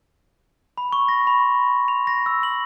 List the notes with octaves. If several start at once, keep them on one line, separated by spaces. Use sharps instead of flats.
B5
C#6
A#6
B5
C6
F7
A#6
E6
F#7